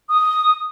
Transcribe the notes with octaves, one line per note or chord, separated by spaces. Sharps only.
D#6